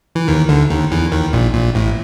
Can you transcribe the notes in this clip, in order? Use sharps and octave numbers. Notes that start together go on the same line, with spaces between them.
E3
D#2 D#3
D2 D3
D#2 D#3
E2 E3
D#2 D#3
A#1 A#2
A#1 A#2
A1 A2